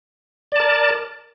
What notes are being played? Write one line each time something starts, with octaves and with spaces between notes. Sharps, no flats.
A#4 D5 A5